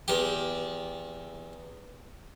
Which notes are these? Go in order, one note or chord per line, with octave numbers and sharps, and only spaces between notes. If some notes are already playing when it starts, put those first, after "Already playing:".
E2 G4